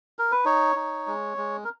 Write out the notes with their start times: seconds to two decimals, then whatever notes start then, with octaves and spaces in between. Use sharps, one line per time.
0.19 A#4
0.32 B4
0.45 D#4 C#5
0.76 D#4
1.07 G#3
1.37 G#3
1.64 A#4